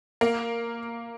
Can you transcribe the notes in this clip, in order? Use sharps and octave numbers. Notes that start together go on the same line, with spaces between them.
A#3